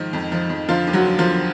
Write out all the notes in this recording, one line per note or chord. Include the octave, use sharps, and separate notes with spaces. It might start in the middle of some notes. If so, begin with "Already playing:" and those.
Already playing: G#2 D#3 F3 D#4
F2
F3
F2
D3 F3 F4
D#2
F#3 F#4
D3
F3 F4
D3